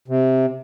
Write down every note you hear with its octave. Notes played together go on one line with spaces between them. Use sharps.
C3